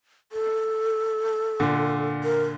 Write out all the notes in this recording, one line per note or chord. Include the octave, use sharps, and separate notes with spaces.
A4
A#2 D3
A#4